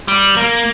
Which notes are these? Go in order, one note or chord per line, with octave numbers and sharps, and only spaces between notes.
G3
A#3